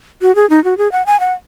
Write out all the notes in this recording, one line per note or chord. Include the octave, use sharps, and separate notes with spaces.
F#4
G#4
D#4
F#4
G#4
F#5
G#5
F#5